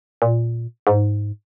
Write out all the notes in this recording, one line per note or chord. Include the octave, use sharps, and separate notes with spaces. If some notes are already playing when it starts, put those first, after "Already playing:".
A#2
G#2